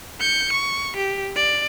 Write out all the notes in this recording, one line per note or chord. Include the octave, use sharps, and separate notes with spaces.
G6 C#7
C#6
G4
D5